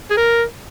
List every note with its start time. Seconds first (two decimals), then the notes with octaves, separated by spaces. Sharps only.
0.10 G#4
0.17 A#4